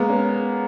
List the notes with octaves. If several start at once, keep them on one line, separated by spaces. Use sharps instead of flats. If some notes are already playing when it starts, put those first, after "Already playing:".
Already playing: G#3 A#3 B3
C#4